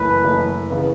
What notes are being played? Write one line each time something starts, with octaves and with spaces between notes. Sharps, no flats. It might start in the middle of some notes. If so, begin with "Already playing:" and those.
Already playing: F#1 F#2 E3 A3 B4
F#1 F#2 E3 A3
C#3 E3 B3